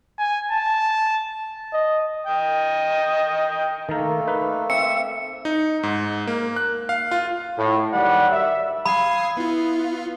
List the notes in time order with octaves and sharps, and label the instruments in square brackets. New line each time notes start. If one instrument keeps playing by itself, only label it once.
[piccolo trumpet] G#5
A5
[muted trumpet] D#5
[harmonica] D#5 G5
[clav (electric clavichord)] D#3 A#4 [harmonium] A3 A#3 A4
[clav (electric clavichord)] D#4 B4
[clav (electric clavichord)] C4 [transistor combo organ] E5 [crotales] C#7
[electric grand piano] D#4
G#2
A#3
F#6
F5
F4
[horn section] A2
D#3 F#3 G3 D5 F#5 B5
E5
[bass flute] F5 [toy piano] B5 [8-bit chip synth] D#6 G#6 C7
[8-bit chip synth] B3 F4 [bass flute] E4